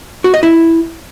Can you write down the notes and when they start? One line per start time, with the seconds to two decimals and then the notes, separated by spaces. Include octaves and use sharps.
0.24 F#4
0.34 D#5
0.43 E4